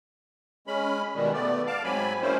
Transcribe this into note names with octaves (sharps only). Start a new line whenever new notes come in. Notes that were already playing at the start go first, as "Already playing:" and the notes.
G#3 C#4 B5
B2 D#3 G3 G#3
A3 B3 D5
F5 A5 D6
G#2 F#3 C4 G#5 B5
F3 G#3 A#3 C#4 E4 C5